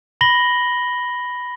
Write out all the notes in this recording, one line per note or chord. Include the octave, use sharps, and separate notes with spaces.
B5 A#6 F#7 G7